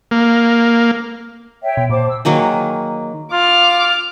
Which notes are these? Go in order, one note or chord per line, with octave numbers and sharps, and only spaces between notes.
A#3
C#5 E5 G5
B2
A#2 C5 A5 D6
E6
D#3 F#3 A#3 G#4
F4 D6 F6